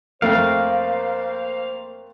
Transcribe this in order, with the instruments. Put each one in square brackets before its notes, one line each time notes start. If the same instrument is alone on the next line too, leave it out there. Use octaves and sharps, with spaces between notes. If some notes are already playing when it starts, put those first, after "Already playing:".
[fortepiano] F2 A3 A#4 [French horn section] A#3 C5 [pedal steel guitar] F5